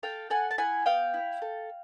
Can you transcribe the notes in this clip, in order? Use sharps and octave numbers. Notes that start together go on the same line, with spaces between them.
A4 F5 G5
A4 F#5 G#5
A5
E4 F#5 G#5
B3 F5 G5
E4
A4